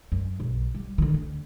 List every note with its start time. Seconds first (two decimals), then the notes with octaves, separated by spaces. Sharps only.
0.12 F#2
0.40 B1
0.75 G3
0.98 D3 D#3
1.14 D2